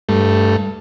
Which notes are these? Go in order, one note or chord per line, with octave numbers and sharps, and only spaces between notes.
G2 A3